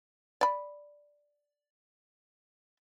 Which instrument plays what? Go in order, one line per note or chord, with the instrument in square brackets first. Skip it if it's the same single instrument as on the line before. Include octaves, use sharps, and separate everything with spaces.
[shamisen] D5 B5